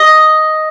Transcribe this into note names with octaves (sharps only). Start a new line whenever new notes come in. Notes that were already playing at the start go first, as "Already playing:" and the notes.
Already playing: D#5